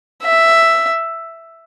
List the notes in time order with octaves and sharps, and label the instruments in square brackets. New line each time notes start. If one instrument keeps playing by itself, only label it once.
[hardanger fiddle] E5